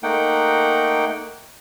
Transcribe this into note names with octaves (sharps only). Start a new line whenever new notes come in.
A3 A#3 D#4 F#5 G5